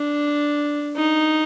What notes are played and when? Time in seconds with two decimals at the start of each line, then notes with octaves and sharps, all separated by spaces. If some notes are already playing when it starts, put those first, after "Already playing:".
Already playing: D4
0.96 D#4